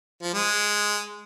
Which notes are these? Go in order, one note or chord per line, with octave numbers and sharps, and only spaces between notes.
F3
G#3